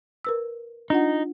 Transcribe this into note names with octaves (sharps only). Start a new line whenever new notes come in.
A#4 B4 E6
D4 D#4 F4 F#5